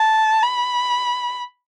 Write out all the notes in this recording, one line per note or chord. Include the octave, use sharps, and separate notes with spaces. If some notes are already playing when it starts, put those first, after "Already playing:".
Already playing: A5
B5